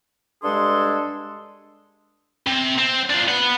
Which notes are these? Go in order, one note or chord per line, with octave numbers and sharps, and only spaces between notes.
G2 G#3 D4 G#4 A4 C6
C3
C4
D4 F4
B4 F#5